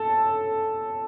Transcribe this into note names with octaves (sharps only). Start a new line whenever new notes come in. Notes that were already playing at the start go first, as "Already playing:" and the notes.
Already playing: A4